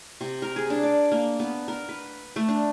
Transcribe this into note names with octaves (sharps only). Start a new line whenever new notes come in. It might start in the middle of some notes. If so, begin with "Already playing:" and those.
C3
A#4
G#4
D4
D5
A#3
B3
A#4
B4
A3
D4